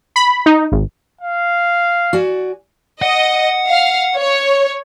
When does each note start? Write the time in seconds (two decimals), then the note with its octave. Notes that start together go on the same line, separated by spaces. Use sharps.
0.16 B5
0.46 D#4
0.72 G#1
1.21 F5
2.13 F#4 D5 G#5
3.02 D#5 F#5
3.68 F5
4.16 C#5